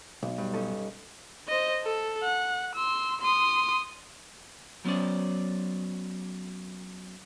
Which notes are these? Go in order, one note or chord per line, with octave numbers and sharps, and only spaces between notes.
B1
G2
C#4 D#4 A4
C5 D#5
A4
F#5
C6 E6
C6 D#6
F#3 B3 C#4 C5 D5